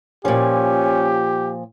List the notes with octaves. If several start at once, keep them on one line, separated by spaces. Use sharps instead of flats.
A#2 F3 C#4 G4